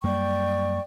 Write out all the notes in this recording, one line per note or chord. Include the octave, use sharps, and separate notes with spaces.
F#2 G3 A#3 D5 G5 C#6